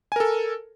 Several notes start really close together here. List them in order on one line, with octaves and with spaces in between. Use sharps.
G#5 A#4 A4